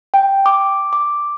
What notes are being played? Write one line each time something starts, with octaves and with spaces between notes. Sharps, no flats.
G5
D6
D6